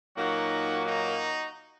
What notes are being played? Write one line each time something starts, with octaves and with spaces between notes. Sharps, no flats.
A#2 F#3 A#3 D#4 F#4
D#4 F#4